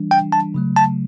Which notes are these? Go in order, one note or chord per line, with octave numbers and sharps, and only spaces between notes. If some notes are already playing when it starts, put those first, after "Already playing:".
Already playing: E3 G3 D4
G5
A5
C#3 F#3 A3
A5